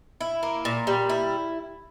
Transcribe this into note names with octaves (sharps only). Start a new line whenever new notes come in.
E4
A#3
A#2
G3
E4